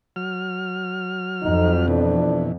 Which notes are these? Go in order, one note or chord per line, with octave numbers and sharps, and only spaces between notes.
F#3 F6
F2 D#4
B2 E3 D4